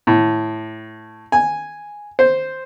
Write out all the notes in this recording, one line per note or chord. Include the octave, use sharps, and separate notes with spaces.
A2
G#5
C5